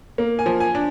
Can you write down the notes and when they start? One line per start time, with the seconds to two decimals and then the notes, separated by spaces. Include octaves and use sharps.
0.18 A#3
0.39 G#5
0.46 F3
0.60 G#5
0.75 D4